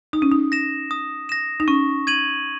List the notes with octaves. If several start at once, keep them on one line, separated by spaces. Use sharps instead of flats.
D#4 D#6
C#4
D#4
A#6 E7
D#6
A#6 E7
D#4
C#4 C#6
G#6 D#7 F#7